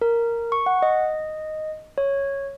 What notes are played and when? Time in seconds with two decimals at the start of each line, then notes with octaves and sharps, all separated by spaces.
0.01 A#4
0.52 C#6
0.66 F#5
0.82 D#5
1.98 C#5